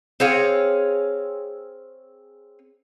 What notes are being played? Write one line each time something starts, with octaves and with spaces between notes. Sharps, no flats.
C4 G#4 C#5 F5